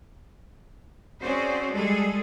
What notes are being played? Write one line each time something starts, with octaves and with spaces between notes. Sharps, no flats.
C4 C#4 F#4 G#4 C5 D5
G3 G#3 G#4 A4